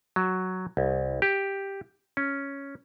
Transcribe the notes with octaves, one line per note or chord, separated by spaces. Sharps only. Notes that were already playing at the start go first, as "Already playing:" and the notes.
F#3
C2
G4
C#4